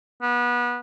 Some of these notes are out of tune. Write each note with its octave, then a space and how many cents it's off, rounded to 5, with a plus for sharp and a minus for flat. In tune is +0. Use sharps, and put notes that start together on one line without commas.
B3 -25